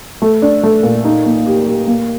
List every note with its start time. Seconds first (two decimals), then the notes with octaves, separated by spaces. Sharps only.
0.22 A3
0.42 D4
0.63 A3
0.83 A#2
1.05 D#4
1.26 A#3
1.47 G4
1.66 G4
1.87 A#3